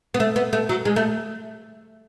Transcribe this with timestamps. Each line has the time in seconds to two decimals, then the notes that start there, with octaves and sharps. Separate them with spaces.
0.14 B3
0.20 A3
0.36 B3
0.53 A3
0.69 F#3
0.85 G#3
0.96 A3